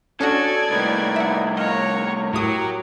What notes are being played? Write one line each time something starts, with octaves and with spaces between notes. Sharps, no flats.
C#4 D4 F#4 A4 D5 D#6 G#6
C2 A2 A#3 D#4 B4
E5 F#5
A#4 C#5 D#5 F5 F#5 A#5
A2 F#3 G4 A#4 C#6 D#6